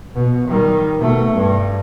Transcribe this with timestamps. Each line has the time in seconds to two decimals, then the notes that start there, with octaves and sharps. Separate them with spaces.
0.15 B2
0.48 D#3 G3
0.97 B2 A3
1.33 G2